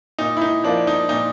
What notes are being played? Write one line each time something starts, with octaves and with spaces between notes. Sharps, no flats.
A#2 D#4
E4
D#4
F3 A#3 D4
D#4
A#2 D#4